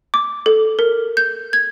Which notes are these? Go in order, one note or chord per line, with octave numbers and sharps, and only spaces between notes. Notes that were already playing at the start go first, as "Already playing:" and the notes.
D6
A4
A#4
G6
G#6